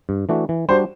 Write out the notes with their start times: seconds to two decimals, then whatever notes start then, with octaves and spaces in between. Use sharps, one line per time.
0.09 G2
0.29 E3 A3 D4 F#4
0.49 E3
0.69 G3 D4 F#4 C5